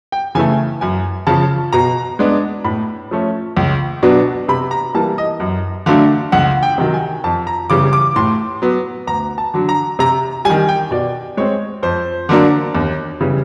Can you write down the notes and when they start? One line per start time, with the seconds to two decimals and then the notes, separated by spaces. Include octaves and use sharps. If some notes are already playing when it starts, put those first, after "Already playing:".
0.12 G5
0.35 C#3 E3 A3 G#5
0.81 F#2 G#5
1.27 C#3 F3 A5
1.73 B2 A#5
2.19 G#3 B3 D4
2.65 A2 B5
3.11 F3 A3 C#4
3.57 C#2
4.03 B2 F#3 B3 D4
4.48 C3 B5
4.71 A#5
4.94 E3 G3 A#3 A5
5.18 D#5
5.40 F#2
5.86 D3 F#3 A3 D4 F5
6.32 C#2 F#5
6.63 G5
6.78 C3 D#3 F#3
6.94 G#5
7.24 F2 A5
7.47 A#5
7.70 C#3 E3 G3 D6
7.93 D6
8.16 A2 C6
8.62 F#3 B3
9.07 D2 A#5
9.38 A5
9.54 D3 F#3
9.69 A#5
9.99 C3 A#5
10.45 G3 G#5
10.50 D#3
10.69 G5
10.91 B2 D5
11.37 G#3 C4 C#5
11.83 F2 C5
12.29 D3 F#3 A#3 D4
12.75 D#2
13.21 C#3 E3 G3